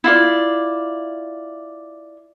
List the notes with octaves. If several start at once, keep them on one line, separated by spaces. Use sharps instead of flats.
E4 F4 D5